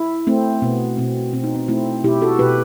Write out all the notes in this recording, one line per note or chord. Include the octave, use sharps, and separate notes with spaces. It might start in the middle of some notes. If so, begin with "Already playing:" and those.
Already playing: E4
A3 C4
B2 B3
B2 C4
B2 C4
D#4
C4
A3 C4 E4
B2 E4 G4
F#4 A4
B2 G4 B4